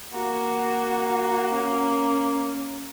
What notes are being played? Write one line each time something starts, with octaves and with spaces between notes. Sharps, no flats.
A#3 F#4
C#4